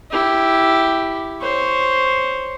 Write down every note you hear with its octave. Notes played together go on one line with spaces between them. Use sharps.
E4 G4
C5 C#5